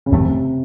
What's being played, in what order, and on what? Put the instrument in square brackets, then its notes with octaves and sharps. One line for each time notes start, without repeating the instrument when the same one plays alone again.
[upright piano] C#3
[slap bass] F#1 F2 D#3 A3 [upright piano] C3